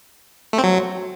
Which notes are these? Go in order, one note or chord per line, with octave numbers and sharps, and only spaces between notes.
A3
C4
F#3